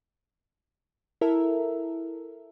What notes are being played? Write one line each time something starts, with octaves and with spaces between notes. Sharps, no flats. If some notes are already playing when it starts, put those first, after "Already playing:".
E4 A4 A#4 E5